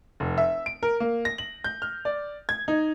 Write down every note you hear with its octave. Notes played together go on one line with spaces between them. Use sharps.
F1
E5
D7
A#4
A#3
A#6
F#7
G6
F6
D5
G#6
D#4